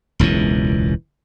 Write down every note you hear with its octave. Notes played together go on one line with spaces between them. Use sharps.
E1 C#2 F#2 E3